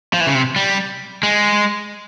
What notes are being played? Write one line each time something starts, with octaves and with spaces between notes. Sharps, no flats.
F3
E3
C#3
C3
G3
G#3